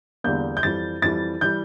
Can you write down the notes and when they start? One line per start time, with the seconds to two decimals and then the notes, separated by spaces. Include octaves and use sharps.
0.24 E2 D3 G3 A#3 G6
0.57 G6
0.63 F2 E3 G3 A6
1.02 F2 E3 G3 A6
1.41 E3 G3 G6